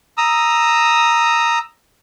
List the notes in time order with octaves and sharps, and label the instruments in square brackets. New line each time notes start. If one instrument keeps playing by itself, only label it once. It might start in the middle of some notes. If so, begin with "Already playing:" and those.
[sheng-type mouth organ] A#5 D#6 E6